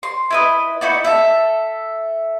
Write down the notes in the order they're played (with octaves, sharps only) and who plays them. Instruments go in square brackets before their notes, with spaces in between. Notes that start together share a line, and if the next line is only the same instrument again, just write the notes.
[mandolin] C6
E4 B4 D#5
D#4 E4 F#4 D5
A4 E5